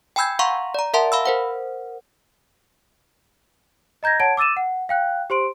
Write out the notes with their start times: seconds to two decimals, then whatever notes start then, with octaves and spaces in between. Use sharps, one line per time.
0.16 G5 G#5 B5 E6 G6 G#6
0.39 F5 F#5 A#5 C6 C#6
0.74 D5 A#5
0.94 A#4 E5 F#5 A5 C6
1.12 F5 B5 E6
1.26 A#4 C5 F#5
4.03 D#5 A#5 G6 G#6 A#6
4.20 C#5 F#5 A5 G#6 D7
4.37 D6 E6 A6 D#7 E7
4.57 F#5
4.89 F5 G5 F#6
5.30 G4 C5 C6 D7